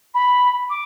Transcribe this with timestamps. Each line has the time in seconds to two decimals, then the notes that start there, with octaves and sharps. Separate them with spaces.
0.14 B5
0.69 D6